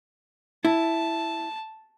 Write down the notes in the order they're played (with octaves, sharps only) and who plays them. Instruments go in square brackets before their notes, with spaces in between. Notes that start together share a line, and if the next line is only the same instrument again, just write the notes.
[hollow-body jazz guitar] E4 [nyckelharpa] A5